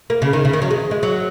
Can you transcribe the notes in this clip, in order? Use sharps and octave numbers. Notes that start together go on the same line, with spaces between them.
A#3
C#3
D#3
C#3
D#3
F#3
G#3
G#3
F#3